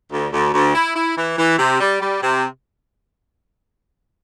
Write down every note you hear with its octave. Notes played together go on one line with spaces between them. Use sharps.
D2
D2
D2
E4
E4
E3
E3
C3
G3
G3
C3